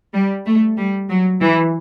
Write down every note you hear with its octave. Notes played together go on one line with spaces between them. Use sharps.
G3
A3
G3
F#3
E3